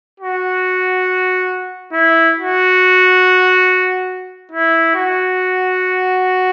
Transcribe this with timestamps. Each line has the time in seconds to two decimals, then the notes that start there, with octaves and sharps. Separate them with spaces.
0.20 F#4
1.93 E4
2.37 F#4
4.52 E4
4.95 F#4